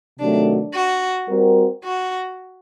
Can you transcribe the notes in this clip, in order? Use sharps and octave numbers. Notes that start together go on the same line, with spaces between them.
C3 D#3 F#3 A3 D4
F#4
G3 C4 F#4 A#4
F#4